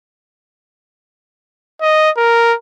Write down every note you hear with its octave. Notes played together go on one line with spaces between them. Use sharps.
D#5
A#4